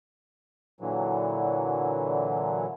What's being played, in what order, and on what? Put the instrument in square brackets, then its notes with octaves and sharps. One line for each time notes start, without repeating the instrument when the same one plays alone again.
[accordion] A#2 D3 E3 F#3